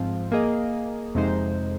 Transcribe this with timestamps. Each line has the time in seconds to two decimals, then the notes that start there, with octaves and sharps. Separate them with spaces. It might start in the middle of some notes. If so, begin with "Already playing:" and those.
Already playing: G#2 F3 C4 F4
0.32 A#3 G#4 D#5
1.15 F2 C3 G#3 D#4 C5